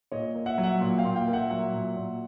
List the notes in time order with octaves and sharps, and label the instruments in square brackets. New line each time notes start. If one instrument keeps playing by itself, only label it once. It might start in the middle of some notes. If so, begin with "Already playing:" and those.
[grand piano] A#2 C#5 D#5
A#3
E5 F#5
F#3
E5 F#5
A#2
F5 G5
A#2
F5 G5
A#3
E5 F#5
F#3 E5 F#5
A#2
A#2